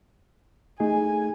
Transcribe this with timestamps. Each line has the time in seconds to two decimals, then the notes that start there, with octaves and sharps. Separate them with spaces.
0.80 A3 D#4 G#4 G#5